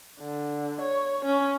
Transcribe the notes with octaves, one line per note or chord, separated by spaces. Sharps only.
D3
C#5
C#4